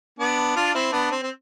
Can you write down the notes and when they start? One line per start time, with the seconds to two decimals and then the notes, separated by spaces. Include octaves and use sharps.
0.19 B3 D4
0.56 D4 F4
0.75 C4 E4
0.92 B3 D4
1.12 C4
1.23 C4